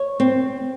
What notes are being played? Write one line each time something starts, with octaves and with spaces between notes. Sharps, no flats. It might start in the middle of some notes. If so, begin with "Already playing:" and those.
Already playing: C#5
C4